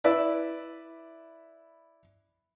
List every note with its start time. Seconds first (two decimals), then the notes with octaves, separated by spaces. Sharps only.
0.04 E4 B4 D5 E5